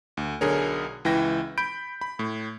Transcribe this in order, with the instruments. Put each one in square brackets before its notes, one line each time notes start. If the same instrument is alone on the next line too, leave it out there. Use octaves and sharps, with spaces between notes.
[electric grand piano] D2
B1 D3 G#4 A#4 C#5
C#2 E3 E4 G5 A#6
B5 G6 D7
B5
A2